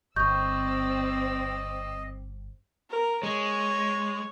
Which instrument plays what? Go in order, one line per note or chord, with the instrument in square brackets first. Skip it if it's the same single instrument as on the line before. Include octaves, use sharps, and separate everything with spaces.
[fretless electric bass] G1 [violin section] C4 D5 E6 [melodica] D#5 [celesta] C#6 G6
[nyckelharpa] A#4
[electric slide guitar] G#3 [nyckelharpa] C#5